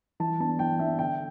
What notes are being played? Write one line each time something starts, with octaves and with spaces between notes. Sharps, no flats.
E3 A5
B3 D4 A5
E3 G5
B3 D4 E5
D3 G5